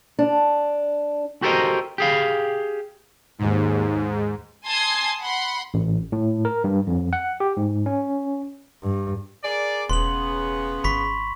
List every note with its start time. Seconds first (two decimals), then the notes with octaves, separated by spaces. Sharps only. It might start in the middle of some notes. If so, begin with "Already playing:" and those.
0.19 D4
1.42 F#4 G4 A4 A#4 C5 D#5
1.98 G4 G#4 F5
3.39 D#2 G#2
4.65 G#5 A5 C6 D#6 G#6 C7
5.20 F#5 B5 C6
5.74 A1
6.12 A2
6.45 A#4
6.64 G2
6.87 F2
7.13 F#5
7.40 G4
7.57 G#2
7.86 C#4
8.83 G2
9.44 G#4 A#4 D5
9.90 E1 C#3 B3 C6 F#7
10.84 G#1 B5 C#6 B6